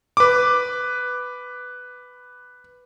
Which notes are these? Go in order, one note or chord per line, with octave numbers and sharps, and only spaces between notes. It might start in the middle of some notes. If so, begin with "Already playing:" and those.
B4 D6